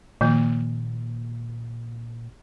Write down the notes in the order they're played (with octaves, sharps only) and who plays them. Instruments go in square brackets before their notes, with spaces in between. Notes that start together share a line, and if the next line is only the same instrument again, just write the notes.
[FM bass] A#2 [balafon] D#3 F3 A#3